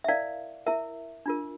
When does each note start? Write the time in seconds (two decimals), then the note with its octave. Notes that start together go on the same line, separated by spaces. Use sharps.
0.04 E5
0.08 E4 A#4 D5 F5
0.66 E4 A#4 E5
1.26 D4 F4 A#4